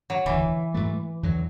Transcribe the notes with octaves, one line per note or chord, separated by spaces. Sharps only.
F#3
E1 D2 D3 E3
G#2 F#3 A3
E2 D3 F#3